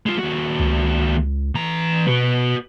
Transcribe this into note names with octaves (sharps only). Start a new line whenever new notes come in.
G#3 F4
D#2 F#4
C#2
E3 A#5
B2 F#4 B4